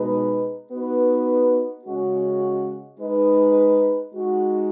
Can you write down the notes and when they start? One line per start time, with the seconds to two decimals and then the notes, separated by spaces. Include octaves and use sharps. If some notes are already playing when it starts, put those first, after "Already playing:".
Already playing: B2 G#3 D#4 B4
0.71 B3 D#4 F#4 B4
1.85 C#3 G#3 C#4 F#4
2.99 G#3 D#4 B4
4.14 G#3 D#4 F#4